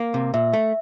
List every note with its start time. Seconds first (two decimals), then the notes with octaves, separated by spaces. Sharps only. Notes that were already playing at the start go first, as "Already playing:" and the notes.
Already playing: A#3
0.14 C3
0.34 A#2 E5
0.53 A3